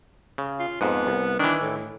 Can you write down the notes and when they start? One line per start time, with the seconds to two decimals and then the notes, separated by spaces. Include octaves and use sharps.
0.38 C#3
0.59 F4
0.81 F2 G#2 B3
1.07 C2
1.39 D#3 E3 D4
1.62 A2